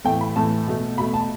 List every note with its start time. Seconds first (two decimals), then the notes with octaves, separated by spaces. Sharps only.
0.04 A2 E3 A3 G5
0.21 B5
0.36 A2 E3 A3 A5
0.67 B2 A3
0.97 B2 A3 B5
1.14 A5